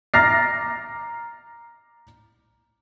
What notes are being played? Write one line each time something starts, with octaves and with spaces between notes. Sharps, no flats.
A#5 D6 F6 A6 A#6 C7